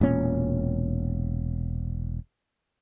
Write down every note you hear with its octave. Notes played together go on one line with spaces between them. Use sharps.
E1 A#2 C#4